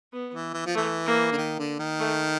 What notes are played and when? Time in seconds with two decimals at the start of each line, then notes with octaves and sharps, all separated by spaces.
0.13 B3
0.34 E3
0.54 E3
0.66 F3
0.75 E3 A3
1.06 A#3
1.32 D3
1.38 D#3
1.59 D3
1.79 D#3
2.00 A3